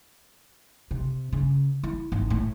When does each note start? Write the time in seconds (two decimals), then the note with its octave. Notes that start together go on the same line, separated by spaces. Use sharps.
0.91 C3
1.32 C#3
1.83 E4
2.12 G#1
2.30 A2